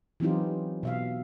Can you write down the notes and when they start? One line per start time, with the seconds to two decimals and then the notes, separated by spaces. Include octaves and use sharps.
0.20 E3 F#3 C4 D#4 F4 G4
0.83 B2 E5 F5